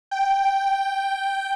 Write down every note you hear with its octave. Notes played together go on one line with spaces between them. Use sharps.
G5